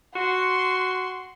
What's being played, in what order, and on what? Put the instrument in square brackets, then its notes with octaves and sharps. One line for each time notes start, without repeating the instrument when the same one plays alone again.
[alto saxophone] F#4 [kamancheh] C6